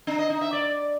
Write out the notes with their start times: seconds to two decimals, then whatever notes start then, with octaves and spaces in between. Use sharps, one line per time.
0.07 D4
0.18 D#5
0.30 D#4
0.41 E5
0.53 D5